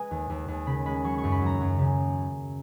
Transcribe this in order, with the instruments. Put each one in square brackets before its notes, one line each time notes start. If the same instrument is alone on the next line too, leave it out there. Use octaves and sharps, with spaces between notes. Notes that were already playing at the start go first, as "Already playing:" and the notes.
Already playing: [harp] G#3 G#4 B4 G#5
D#2
D#2
D#2
C#3 B5
G#3 B5
F#3 C#6
C#6
F#2
B5
F#3 A#5
F#2
C#3